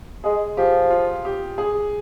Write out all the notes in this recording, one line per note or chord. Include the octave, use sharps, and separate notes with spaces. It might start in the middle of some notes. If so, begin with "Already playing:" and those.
G#3 G#4
F3 G4
F4
G4
G#4